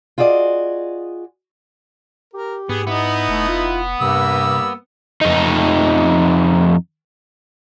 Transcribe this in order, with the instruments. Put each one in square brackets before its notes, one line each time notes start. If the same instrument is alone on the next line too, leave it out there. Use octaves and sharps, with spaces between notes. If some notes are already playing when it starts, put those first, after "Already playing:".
[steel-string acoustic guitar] F4 F#4 G#4 D5 D#5
[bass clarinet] G4 [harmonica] A#4
[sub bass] G#2 [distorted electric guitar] B3 [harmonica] G#4
[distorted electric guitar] B3 [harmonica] D#4 E4
[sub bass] F1 [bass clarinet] A3
[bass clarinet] F4
[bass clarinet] G2 [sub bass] C3 [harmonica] G3 A#3 E6
[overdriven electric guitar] F2 D#4